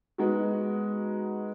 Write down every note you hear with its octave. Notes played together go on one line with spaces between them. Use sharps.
G#3 B3 D#4 F#4